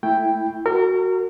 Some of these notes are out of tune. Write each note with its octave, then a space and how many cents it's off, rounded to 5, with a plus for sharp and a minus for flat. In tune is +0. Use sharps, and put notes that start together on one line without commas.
A3 +0 E4 +0 G5 +0
F#4 +0 A#4 -30